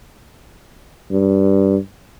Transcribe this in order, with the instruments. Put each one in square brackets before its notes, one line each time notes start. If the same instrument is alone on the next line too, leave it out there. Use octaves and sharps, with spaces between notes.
[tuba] G2